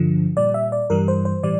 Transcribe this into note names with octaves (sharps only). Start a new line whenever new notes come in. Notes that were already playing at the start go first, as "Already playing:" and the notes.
Already playing: G2 D3 F3
A#2 G3 D5
E5
D5
G2 E3 G3 A#4
C5
C5
A2 E3 G3 D5